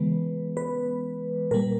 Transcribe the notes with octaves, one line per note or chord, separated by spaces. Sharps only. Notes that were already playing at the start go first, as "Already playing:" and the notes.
Already playing: C#3 E3 G#3 B3 B4
B4
A#2 G3 A#3 A#4